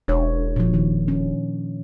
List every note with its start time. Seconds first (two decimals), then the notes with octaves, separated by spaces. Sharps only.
0.08 E1 D4 C#5
0.56 A#2 F3
0.74 D#3
1.08 C#4